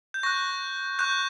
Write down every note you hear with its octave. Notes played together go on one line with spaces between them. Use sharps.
G6
C#6 F#6 A#6
C#6 F#6 G6